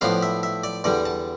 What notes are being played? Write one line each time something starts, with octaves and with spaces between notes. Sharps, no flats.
A2 F3 B3 D4 F5
E5
E5
D5
E2 D3 G3 D5
A5